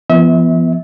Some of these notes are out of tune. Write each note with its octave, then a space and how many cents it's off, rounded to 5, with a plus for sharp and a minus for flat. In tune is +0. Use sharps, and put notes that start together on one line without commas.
F3 -45 B3 +0 E5 -40